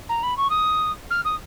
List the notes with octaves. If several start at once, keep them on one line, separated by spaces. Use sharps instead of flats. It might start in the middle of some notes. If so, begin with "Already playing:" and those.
A#5
B5
C#6
D#6
F6
D#6